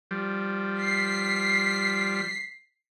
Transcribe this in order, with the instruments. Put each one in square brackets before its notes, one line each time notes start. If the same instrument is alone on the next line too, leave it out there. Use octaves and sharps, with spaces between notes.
[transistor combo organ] F3 G3
[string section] B6 C7